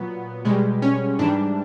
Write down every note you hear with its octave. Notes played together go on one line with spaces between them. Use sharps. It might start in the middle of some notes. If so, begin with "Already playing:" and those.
Already playing: A#2 F#3 B3
B2 G3 G#3
C#4
G#2 E3 G3 D4